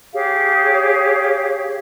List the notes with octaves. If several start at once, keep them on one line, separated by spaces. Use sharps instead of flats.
G4 G#4 C#5 F5